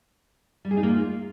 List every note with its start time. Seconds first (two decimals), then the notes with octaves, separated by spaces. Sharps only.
0.65 G3
0.71 G#4
0.77 D#4
0.83 A#3
0.89 F4